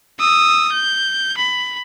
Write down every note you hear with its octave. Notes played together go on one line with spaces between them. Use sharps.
D#6 E6
G6
B5